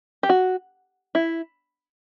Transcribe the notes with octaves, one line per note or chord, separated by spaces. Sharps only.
G4
F#4
E4